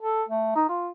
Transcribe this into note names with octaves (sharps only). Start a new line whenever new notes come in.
A4
A3
D#4
F4